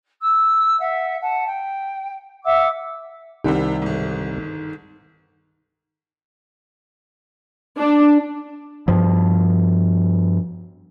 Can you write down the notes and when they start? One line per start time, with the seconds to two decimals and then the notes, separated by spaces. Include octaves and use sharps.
0.20 E6
0.80 E5 F#5
1.21 F#5 A5
1.47 G5
2.44 E5 F#5 D6 E6
3.44 C2 C3 D#3 G3 G4 C5 F#5
3.82 G1 G#2
7.79 D4
8.88 G2 F3